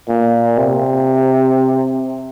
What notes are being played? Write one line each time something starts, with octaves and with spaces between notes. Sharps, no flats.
A#2
C3